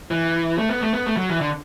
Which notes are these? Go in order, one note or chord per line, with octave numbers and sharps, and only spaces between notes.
E3
A3
B3
A3
B3
A3
F#3
E3
D3